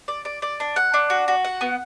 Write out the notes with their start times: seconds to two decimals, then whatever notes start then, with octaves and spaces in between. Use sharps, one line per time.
0.08 D5
0.25 D5
0.42 D5
0.60 D4
0.76 F#5
0.94 D4
1.10 F#4
1.28 F#4
1.45 F#5
1.61 B3